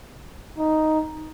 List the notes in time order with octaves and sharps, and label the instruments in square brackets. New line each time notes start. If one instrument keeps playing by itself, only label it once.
[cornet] D#4